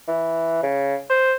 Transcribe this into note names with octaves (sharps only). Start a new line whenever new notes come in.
E3
C#3
C5